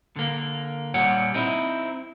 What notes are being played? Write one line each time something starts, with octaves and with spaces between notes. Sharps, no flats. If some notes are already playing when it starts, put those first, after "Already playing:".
D3 A#3
A#2 G3 C#5 F#5
C4 D#4 E4